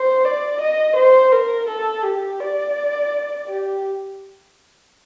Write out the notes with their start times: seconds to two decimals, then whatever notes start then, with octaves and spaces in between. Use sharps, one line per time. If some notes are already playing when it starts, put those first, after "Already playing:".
Already playing: C5
0.25 D5
0.61 D#5
0.96 C5
1.32 A#4
1.68 A4
2.04 G4
2.40 D5
3.47 G4